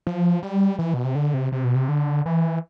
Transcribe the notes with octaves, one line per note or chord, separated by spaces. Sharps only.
F3
G3
E3
B2
C3
D3
C3
C3
B2
C3
D3
E3